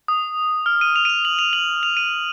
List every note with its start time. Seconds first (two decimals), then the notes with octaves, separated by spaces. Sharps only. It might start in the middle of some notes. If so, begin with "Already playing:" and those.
0.08 D#6
0.66 F6
0.81 D#7
0.96 F7
1.05 D#7
1.10 F7
1.25 F#7
1.39 F7
1.53 F#7
1.83 F7
1.97 D#7